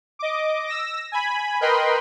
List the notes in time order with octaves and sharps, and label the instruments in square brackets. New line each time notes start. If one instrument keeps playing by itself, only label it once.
[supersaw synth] D#5 D6
E6 A#6
G#5 B5
A#4 B4 D#5 G5 B5 C6